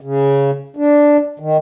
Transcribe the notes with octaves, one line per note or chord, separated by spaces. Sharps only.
C#3
D4
D#3